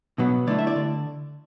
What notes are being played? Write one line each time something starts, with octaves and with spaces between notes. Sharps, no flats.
B2 F#3 B3
D3 A3 E4 D5
E5
D5
D3